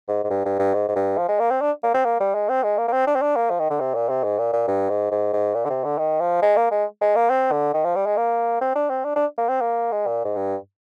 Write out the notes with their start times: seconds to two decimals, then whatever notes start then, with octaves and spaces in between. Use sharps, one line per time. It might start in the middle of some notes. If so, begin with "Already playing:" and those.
0.08 G#2
0.24 G#2
0.30 G2
0.45 G2
0.59 G2
0.74 G#2
0.89 G#2
0.95 G2
1.18 F3
1.29 G#3
1.40 A#3
1.51 C4
1.61 D4
1.83 A#3
1.94 C4
2.05 A#3
2.20 G3
2.34 G#3
2.49 C4
2.63 G#3
2.78 A#3
2.88 A#3
2.93 C4
3.07 D4
3.15 C4
3.22 D4
3.36 A#3
3.50 F3
3.60 D#3
3.70 D3
3.80 C3
3.95 A#2
4.09 C3
4.24 G#2
4.38 A#2
4.53 A#2
4.67 G2
4.90 G#2
5.11 G#2
5.33 G#2
5.54 A#2
5.65 D3
5.70 C3
5.84 D3
5.98 D#3
6.20 F3
6.42 G#3
6.56 A#3
6.71 G#3
7.01 G#3
7.16 A#3
7.30 C4
7.52 D3
7.73 D#3
7.84 F3
7.96 G3
8.06 G#3
8.17 A#3
8.61 C4
8.75 D4
8.90 C4
9.05 D4
9.16 D4
9.38 A#3
9.49 C4
9.61 A#3
9.92 G#3
10.06 A#2
10.24 G#2
10.36 G2